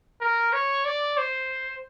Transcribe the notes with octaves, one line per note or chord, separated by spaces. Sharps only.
A#4
C#5
D5
C5